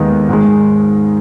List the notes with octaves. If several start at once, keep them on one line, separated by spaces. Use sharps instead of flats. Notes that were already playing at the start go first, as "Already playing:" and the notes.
Already playing: D#2 D#3 G#3 B3 D#4
G#2 D#3 G#3